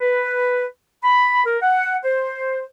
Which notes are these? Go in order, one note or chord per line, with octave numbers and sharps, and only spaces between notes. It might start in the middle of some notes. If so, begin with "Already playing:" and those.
B4
B5
A#4
F#5
C5